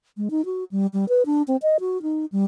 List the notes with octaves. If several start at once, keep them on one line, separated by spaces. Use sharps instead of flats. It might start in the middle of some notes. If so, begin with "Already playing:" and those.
G#3
D#4
F#4
G3
G3
B4
D4
C4
D#5
F#4
D#4
G3